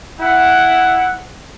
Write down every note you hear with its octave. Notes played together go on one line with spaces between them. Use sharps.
E4 F#5